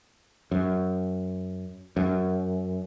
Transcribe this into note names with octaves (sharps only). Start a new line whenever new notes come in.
F#2
F#2